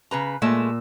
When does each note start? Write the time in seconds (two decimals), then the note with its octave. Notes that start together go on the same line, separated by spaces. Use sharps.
0.11 C#3 B4 A#5
0.42 A#2 G#3 A3 E6